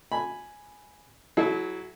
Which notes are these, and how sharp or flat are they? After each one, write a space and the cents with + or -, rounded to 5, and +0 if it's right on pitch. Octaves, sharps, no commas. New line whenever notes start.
G#5 +0 B5 +0
F#3 +5 E4 +0 A4 -40